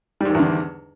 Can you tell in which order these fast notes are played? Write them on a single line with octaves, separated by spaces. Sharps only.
G3 G#2 D#3 E2 D3